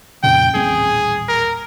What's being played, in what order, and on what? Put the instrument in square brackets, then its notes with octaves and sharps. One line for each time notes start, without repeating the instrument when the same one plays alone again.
[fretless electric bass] F2 A#2 C#3 [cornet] G5
[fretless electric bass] D#1 A1 C4 [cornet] G#4
[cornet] A#4